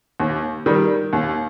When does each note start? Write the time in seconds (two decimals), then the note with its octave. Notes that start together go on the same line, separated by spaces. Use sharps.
0.20 D#2
0.66 D#3 G3
1.13 D#2